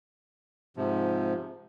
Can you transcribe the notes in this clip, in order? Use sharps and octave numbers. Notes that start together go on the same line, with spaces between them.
G#2 C3 F3